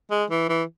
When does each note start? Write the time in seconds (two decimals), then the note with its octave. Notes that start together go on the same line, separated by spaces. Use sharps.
0.11 G#3
0.30 E3
0.49 E3